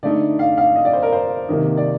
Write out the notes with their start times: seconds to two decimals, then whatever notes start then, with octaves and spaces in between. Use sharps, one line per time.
0.03 D3 A3 D#4 D5
0.39 F5
0.58 F5
0.76 D#5
0.85 D5
0.93 C5
1.03 A#4
1.13 C5
1.48 C3 D#3 A#3 D#4
1.77 D5